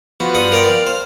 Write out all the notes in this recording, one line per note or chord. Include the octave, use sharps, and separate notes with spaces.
F3 B3 F#4
G2 F#5 D#6
A#4 D5 G5
F5
C5